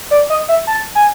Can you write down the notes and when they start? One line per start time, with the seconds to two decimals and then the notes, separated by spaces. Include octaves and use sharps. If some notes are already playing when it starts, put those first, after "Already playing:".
0.11 D5
0.30 D#5
0.49 E5
0.67 A5
0.95 G#5